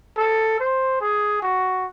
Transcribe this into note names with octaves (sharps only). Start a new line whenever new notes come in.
A4
C5
G#4
F#4